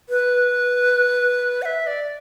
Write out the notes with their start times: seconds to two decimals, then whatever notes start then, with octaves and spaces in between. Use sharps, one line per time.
0.09 B4
1.62 F#5
1.65 E5
1.87 D5